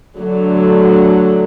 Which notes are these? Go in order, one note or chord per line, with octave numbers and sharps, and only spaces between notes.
D3 F#3 A3